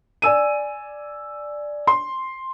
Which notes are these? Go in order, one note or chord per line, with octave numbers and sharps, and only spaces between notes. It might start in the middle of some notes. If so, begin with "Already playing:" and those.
D5 G#5 E6 D#7
C6